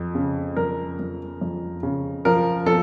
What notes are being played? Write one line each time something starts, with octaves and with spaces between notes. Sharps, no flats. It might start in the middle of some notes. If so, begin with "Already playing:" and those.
Already playing: F2
C#3
F2 A#4
F2
F2
C#3
F3 A#4
F3 A4